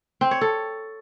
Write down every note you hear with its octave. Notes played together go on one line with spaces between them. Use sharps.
C4
C#5
A4